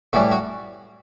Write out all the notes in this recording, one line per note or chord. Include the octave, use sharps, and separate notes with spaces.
A2 E3 G3 F#4
F#4